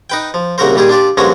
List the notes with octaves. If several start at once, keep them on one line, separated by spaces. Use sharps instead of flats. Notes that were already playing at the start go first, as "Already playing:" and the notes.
D#4 B4 G5
F3
C2 C#3 A#3 F#4 A#4 C5
A#2 D#3 G3 G4 G#4
D4 F4 G4 D5
G2 F3 G#3 A#3 C#4 F#4